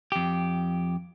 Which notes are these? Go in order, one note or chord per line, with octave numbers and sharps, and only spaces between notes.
F2 G4